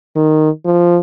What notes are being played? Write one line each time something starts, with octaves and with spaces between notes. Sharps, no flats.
D#3
F3